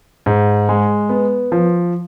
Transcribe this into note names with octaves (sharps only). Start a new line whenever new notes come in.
G#2
G#3
B3
F3